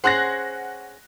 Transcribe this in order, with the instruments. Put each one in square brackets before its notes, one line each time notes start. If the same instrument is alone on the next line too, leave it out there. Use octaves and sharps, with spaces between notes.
[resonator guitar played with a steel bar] C#4 G#4 C5 [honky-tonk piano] F#5 F#6 A#6